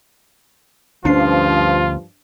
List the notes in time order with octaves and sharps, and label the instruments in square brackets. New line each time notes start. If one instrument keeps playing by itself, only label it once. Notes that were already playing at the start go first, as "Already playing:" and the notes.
[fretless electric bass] D2 C#4 [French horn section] G2 F3 [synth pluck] D4 C7 [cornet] F4